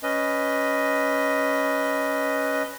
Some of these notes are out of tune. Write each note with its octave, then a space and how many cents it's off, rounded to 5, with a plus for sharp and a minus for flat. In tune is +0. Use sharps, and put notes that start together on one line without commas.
C#4 +0 B4 +0 D#5 +0